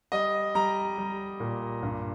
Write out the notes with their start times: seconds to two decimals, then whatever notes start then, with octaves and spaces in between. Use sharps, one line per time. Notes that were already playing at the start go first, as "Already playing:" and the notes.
0.12 G3 D#5
0.55 G3 A#5
0.98 G3
1.40 A#2
1.83 G2